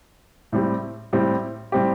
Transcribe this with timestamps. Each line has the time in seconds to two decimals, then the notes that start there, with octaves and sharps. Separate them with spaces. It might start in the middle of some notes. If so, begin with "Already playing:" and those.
0.52 A2 G3 C4 G4
1.13 A2 G3 C4 G4
1.72 A2 G3 C4 G4